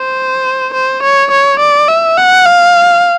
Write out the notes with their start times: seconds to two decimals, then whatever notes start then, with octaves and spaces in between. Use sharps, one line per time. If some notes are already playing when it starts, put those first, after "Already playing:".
Already playing: C5
0.75 C5
1.04 C#5
1.32 C#5
1.60 D5
1.89 E5
2.18 F#5
2.46 F5